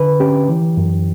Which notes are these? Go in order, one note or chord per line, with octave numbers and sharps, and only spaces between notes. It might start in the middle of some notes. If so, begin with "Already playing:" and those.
Already playing: D3 B4
C#4 G4
E3
F#2